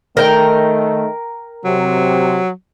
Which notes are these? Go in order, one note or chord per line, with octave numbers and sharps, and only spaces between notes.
D#3 A3 A#4 G5
C3 F#3